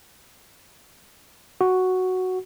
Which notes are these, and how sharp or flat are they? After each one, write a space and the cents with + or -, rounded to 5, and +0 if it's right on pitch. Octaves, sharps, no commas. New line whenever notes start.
F#4 +0